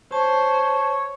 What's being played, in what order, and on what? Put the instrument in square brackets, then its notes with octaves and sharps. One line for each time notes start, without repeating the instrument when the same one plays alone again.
[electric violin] C5 [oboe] C#5 [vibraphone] A5